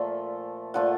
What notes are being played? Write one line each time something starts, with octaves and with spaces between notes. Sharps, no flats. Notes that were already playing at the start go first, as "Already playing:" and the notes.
Already playing: A#2 F3 A3
A#2 F3 A3 F#5